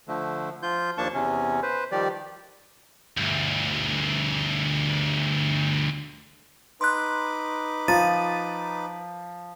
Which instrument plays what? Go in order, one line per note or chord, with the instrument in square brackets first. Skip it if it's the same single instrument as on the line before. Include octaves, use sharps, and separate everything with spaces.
[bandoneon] D3 F3 A3
F3 F4 G6
D#2 F3 A#3 D4 A5 C#6
E2 C3 C#4
B4 C5
D#3 F3 G3 G4 D5
[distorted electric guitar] D2 G2
[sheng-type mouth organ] D#4 B4 D6 [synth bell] C6 F#6
[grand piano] F3 [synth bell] A#5 A6 D#7